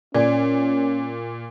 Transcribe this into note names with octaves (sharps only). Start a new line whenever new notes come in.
A#2 C#4 D5 G#5